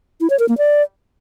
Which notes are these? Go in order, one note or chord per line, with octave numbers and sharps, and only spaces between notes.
E4
C#5
A#4
A#3
D5